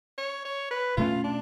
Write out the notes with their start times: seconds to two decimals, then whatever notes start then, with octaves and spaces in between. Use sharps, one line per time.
0.18 C#5
0.45 C#5
0.71 B4
0.97 B2 A3 C#4 F4
1.24 D4